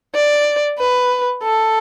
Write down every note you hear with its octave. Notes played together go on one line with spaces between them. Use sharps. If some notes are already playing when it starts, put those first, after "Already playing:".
D5
B4
A4